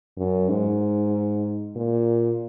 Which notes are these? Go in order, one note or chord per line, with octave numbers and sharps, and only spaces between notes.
F#2
G#2
A#2